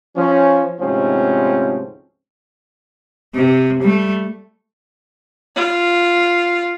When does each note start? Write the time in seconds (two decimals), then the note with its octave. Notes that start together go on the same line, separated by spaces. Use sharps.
0.16 F3 C#4
0.79 D2 G#2 C3 F3 C4 C#4
3.35 C3
3.82 G3 A3
5.56 F4